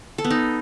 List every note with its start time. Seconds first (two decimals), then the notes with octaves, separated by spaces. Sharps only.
0.18 A4
0.24 B3
0.31 D#4